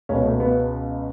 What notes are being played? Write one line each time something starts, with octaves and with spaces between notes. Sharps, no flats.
C#2 B2 C#4
A3
B3